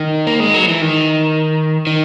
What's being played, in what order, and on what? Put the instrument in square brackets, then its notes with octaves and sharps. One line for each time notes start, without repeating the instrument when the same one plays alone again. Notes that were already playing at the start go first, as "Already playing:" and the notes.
Already playing: [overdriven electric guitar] D#3
A#3
G#3
F#3
E3
D#3
D#3